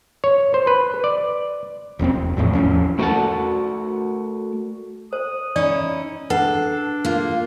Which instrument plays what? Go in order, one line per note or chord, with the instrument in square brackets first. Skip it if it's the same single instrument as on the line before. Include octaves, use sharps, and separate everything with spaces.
[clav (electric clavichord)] C#5
C5
B4
D5
[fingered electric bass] E1 F2 A#3 C4
E1
G#1 E2 A2 F3
E2 F3 C#4
[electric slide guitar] A3 F#4 A#4 F5 F#5 A5
[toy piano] C5 [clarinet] D#6
[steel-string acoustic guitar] C#4 D#4 E4 [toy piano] D5
[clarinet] D4 [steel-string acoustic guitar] A4 [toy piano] B4 F#5
[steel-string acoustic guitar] A#3 F4